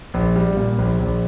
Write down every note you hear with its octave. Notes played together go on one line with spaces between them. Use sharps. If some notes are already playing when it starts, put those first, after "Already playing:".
A#1
G3
A#2
A#1
A#1